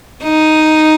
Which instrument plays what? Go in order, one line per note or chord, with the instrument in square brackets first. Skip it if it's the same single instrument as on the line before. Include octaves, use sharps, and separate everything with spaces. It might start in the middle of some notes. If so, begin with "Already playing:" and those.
[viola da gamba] D#4